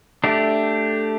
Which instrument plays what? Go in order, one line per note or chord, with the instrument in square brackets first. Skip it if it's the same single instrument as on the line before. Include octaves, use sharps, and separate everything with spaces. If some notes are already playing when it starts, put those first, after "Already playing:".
[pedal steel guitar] A3 D4 G4